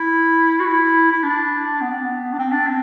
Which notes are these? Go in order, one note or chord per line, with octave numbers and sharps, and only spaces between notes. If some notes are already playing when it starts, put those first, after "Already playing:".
Already playing: E4
F#4
E4
E4
D4
B3
C4
B3
D4
C4
D4
C4